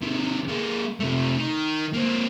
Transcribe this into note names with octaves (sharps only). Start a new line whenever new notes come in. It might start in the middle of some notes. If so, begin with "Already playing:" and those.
C3 D#3
G#3 A#3
C3 A3
D#3
A#3 C4